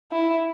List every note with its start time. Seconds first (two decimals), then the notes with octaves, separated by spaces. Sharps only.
0.12 E4